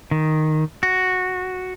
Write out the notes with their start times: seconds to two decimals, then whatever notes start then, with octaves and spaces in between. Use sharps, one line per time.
0.11 D#3
0.83 F#4